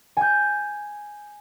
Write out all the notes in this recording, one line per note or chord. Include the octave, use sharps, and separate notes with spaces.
G#5 G6